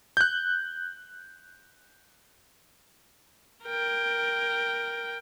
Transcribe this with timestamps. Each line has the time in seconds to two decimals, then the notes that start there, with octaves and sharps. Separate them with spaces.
0.17 F#6 G6
3.65 A#4 G5